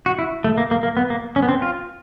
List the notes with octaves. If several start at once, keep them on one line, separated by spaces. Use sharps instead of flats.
F#4
E4
A3
A#3
A#3
A#3
B3
A#3
C#4
B3
C4
F4